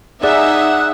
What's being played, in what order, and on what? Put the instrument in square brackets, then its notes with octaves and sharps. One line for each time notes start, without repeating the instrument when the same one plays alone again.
[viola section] D#4 E5 [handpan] G#4 [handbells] D5 [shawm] F#5